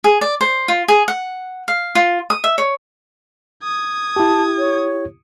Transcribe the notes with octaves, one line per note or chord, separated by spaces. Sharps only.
G#4
D5
C5
F4
G#4
F#5
F5
F4
D#6
E5
C#5
D#6 G#6
E4 G4 A5
C#5